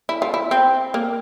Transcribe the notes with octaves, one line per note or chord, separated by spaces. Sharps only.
E4
F4
E4
C4
A#3